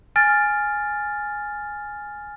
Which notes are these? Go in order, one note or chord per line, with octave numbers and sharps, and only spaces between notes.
G#5 F6 A6